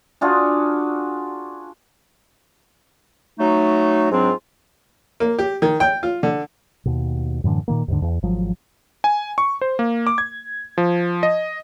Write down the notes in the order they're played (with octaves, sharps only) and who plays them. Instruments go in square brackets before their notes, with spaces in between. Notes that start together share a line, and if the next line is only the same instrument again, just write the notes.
[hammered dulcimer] D4 F4 F#4 G#4
[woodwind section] F#3 A3 D#4
G#2 F#3 C4 D4 F4
[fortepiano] A#3
G4
D#3
G5
F4
D3
[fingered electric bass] D#2 B2
F#2 A2 D3 E3
A#2 D#3 A#3
D#2 G#2 D3
E2
G#1 F3 F#3
[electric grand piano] G#5
C#6
C5
A#3
D6
G#6
F3
D#5